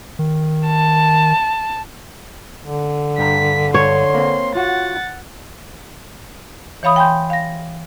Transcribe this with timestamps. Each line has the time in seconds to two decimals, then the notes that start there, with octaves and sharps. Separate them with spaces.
0.19 D#3
0.67 A5
2.63 D3
3.18 G2 G5 A#5 B6
3.74 G2 C#5 C6
4.14 A#3 C4
4.55 F4 F#4 F#5 A6
6.83 E3 C#5 F5 B5 D#6
6.96 G5 G#5 B5 C6 G6
7.30 F5 A#6